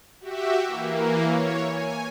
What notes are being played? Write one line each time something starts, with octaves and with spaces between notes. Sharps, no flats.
F#4 G4 E5
E3 A#3
C#5
G#5